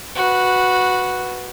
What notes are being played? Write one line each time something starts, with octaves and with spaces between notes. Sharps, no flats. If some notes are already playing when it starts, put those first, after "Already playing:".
F#4 B4